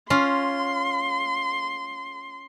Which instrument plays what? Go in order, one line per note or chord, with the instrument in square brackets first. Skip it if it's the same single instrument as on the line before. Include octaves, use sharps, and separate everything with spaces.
[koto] C#4 F4 [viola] C6